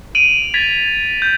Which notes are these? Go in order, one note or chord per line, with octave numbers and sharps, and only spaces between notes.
D7 D#7 F7 F#7
G#6 A6 B6 D#7 F7
G6